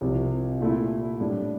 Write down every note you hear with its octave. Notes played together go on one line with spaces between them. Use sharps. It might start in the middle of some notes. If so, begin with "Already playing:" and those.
C2 C3 F3
A#2 A3 E4
A2 G3 D4